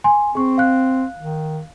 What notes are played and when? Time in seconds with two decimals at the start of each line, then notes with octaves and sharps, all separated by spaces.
0.04 G#5 C6
0.35 C4 G#4 C#6
0.58 F5 F#6
1.17 D#3